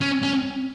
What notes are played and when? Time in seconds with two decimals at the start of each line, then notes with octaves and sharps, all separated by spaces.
0.01 C#4
0.23 C#4